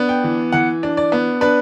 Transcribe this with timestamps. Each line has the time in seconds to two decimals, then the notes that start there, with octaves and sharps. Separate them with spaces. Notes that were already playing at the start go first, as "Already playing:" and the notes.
Already playing: B3 D4
0.09 G5
0.24 E3
0.52 E3 F#5
0.83 D4
0.97 D5
1.12 B3
1.41 D4 B4